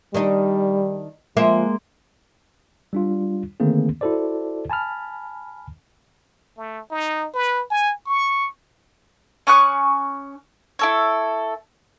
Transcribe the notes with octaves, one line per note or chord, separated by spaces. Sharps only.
D#3 G3 D4 D#4
F3 G#3 A#3 E5
G3 D4 F4
D3 D#3 A3 A#3 C4 G#4
E4 F#4 A4 C5 D5
G#5 A5 B5 F6
A3
D#4
B4
G#5
C#6
C#4 C#6 D#6 F#6
E4 A4 C#5